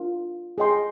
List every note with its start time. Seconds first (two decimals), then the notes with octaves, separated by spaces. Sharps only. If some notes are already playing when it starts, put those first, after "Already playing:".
Already playing: D4 F4 A#4
0.58 G#4 D#5 G5 C6